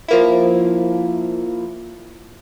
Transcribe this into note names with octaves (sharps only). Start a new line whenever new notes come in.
F3 A#3 E4